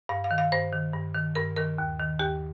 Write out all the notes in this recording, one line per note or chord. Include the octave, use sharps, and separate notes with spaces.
G2 F5
F5
D#3
F5
G2 C5
D#3
G2
D#3
G2 A#4
D#3 A#4
D#2
D#3
D#2 G4